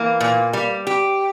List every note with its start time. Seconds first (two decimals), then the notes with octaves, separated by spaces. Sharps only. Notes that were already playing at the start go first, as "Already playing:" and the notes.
Already playing: E3 A#3
0.20 A#2
0.53 G3
0.87 G4